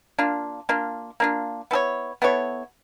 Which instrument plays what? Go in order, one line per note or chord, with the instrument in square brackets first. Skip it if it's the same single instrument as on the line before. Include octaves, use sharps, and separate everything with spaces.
[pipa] A#3 D4 F4
A#3 D4 F4
A#3 D4 F4
B3 E4 A4 C#5
B3 E4 A4 C#5